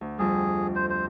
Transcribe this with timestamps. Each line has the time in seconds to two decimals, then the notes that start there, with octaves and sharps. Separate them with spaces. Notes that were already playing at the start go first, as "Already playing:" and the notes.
0.01 D2
0.19 F2 G3 G#4
0.75 C5
0.90 C5